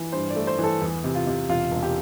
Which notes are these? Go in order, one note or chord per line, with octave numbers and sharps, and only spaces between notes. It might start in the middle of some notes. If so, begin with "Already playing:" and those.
Already playing: E3
G2 C5
D5
A3
C5
E3 A4
E2
C3
F4
C3
E1 F4
E1
G4